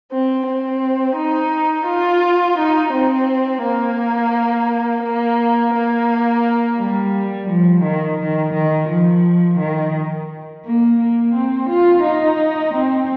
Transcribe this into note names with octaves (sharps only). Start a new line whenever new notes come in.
C4
C4
D#4
F4
D#4
C4
A#3
A#3
A#3
G3
F3
D#3
D#3
D#3
F3
D#3
A#3
A#3
C4
F4
D#4
C4